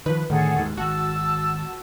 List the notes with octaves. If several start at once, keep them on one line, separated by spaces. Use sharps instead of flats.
D#3 F3 B4
D2 A2 D#3 G#4 A4 F#5
D#2 G#2
G#1 F#4 A5 E6